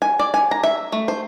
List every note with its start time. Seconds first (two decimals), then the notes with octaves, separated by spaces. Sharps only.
0.02 G#5
0.19 D5
0.34 G#5
0.51 A#5
0.63 E5
0.92 A3
1.08 C5